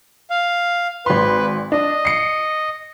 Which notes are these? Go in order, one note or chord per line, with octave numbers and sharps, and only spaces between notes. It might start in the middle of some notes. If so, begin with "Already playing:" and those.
F5
G#1 B4 C6
D4 D#5
C7 C#7